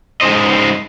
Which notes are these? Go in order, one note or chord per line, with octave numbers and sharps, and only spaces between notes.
G#3 C#4 D#4 C5 D#5